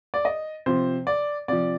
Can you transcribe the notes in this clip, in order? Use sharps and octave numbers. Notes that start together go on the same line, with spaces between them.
D5
D#5
C3 F3 C5
D5
C3 F3 D5